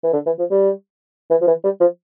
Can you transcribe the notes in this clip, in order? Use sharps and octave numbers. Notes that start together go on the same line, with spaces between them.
E3
D3
E3
F3
G3
E3
F3
E3
G3
F3